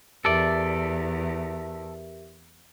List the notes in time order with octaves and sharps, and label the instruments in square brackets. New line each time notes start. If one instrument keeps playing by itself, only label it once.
[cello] E2 [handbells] G4 A#4 E5 [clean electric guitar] A4 D5